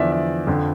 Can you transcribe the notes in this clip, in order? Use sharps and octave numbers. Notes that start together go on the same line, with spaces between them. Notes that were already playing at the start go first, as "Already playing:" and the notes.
Already playing: E2 D3 F3 D5 E5
E5
F2 D3 F3